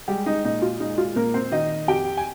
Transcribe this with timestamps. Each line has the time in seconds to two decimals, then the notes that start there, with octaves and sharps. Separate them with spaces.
0.08 G3 G#3 G4
0.26 D#4
0.45 A#2 D#4
0.62 F4
0.80 G#3 D#4
0.98 F4
1.16 A#2 A#3 A#4
1.34 C4 C5
1.52 D#3 D#4 D#5
1.87 F2 G4 G5
2.17 G#5